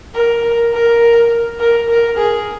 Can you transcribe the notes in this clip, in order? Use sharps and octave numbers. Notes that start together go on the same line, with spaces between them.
A#4
A#4
A#4
A#4
G#4